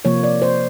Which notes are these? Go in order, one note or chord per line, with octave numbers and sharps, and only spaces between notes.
C3 F3 A#3 C#5
D5
C5